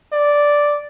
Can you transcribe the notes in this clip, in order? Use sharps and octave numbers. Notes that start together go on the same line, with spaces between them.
D5